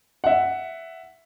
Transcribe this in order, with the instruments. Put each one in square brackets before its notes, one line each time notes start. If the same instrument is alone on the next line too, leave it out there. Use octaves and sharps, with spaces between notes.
[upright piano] E5 F#5